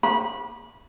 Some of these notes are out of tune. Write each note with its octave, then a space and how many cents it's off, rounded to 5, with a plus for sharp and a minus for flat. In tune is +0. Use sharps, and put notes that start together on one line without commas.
B5 -20